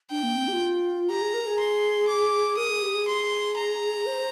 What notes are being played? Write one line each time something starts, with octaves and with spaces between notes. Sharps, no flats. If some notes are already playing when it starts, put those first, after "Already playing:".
D4 G5
A#3
C4
G4
F4
G4 A#5
G#4
A#4
G#4
C6
D6
A#4 D#6
G#4
G4
G#4
C6
A#5
C5